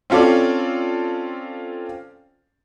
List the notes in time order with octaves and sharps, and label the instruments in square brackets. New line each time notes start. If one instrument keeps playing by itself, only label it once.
[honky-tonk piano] C4 C#4 F4 A4 D5